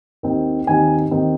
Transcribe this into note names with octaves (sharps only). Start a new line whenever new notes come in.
D#2 D#3 C4 D#4
D#2 D#3 C4 D#4 G#5
D#2 D#3 C4 D#4